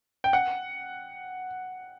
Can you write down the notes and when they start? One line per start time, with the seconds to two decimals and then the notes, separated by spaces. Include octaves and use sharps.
0.24 G5
0.33 F#5